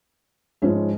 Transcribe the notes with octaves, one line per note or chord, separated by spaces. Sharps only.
G#2 F3 G#3 C#4 E4